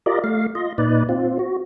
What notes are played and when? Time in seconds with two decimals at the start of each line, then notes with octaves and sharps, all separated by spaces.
0.06 F4 G4 A#4 D5 D#5
0.24 A3 F5
0.55 F4 D#5
0.78 A#2 D#4 B4 D5
1.09 C4 F4
1.39 F#4